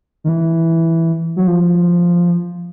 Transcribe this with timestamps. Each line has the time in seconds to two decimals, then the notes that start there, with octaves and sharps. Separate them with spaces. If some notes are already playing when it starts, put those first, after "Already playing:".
0.24 D#3
0.29 E3
1.36 F#3
1.47 F3